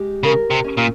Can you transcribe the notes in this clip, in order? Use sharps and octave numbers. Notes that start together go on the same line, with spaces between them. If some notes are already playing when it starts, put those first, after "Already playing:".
Already playing: G#3 G4
C#3 A#4
C3
C#4
A#2